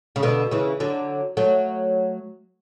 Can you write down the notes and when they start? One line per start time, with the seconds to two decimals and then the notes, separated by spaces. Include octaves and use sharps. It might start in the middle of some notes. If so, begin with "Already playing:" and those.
0.16 C#3
0.23 B2 D3
0.51 C#3 E3
0.80 D3 F#3
1.37 F#3 A3